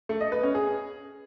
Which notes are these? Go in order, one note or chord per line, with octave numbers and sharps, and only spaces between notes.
A3
D#5
B4
C#4
G#4